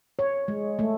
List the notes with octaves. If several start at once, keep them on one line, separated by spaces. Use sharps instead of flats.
C#5
G#3
A3